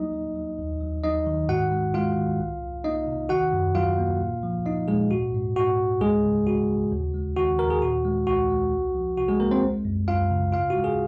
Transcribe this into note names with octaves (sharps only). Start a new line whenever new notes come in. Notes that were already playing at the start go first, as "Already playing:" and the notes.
Already playing: F#3 A#3 D#4 D#5
F#3
F#3
D#2
F#3
F#3 D#4 D#5
D#3
G#2 F#4 F#5
G#3
G#3 F4 F5
D#3
C2
C2
A#3 D#4 D#5
C3
D#3 F#4 F#5
F#2
F#3 F4 F5
A#3
A#2
F3
F3 D#4 D#5
A#2 G#3 G#4
G#2 F#4
G#2
G#2 F#4
G#2
C#2 G#3 G#4
C#3
C#2 F#4
C#3
D#2
G#3
D#3 F#4
D#2 A#4
G#4
A#2 F#4
G#3
C2 F#4
G#3
C2
F3
C3 F#4
G#3 G#4
C2 A#3 A#4
C4 C5
G#3
F#2
F#2 F4 F5
C#3
G#2 F4 F5
F#4
G#3
G#4